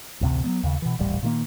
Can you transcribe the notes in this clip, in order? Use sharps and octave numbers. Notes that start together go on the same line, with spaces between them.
A1 D2 C3
F#3 G3 B3
D#2 C#3
B2 E3
D#1 A1 G3
A#2 D#3 A#3